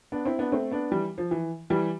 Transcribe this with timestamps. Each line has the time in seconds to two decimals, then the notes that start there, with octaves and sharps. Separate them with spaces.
0.12 B3 D4
0.25 C4 E4
0.39 B3 D4
0.52 A3 C4
0.71 B3 D4
0.91 E3 G3
1.18 F3
1.31 E3
1.70 E3 G3